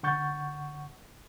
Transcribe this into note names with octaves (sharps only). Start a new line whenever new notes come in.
D3 F#5 C#6 G6 A6